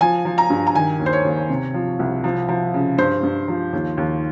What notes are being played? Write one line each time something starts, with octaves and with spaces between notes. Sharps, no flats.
F3 G#5
F3
A#5
G2
A#5
D#3 G#5
D#2
C5
C#5
D#2
C3
F3
C2
F3
F3
C#3
G2 C5
G2
F3
D#2
D#2